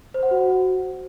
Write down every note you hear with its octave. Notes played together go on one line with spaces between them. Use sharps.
C5
F#5
F#4